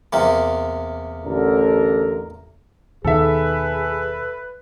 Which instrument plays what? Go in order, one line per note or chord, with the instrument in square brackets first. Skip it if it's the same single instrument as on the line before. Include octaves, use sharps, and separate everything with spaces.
[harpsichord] E2 C3 A#3
[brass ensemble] A1 D3 A#4
[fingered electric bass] D#2 B2 D#3 [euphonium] G#4 [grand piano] A4 E5 [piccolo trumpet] B4